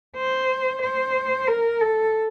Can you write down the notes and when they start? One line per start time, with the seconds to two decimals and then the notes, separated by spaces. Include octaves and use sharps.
0.16 C5
0.82 C5
1.47 A#4
1.81 A4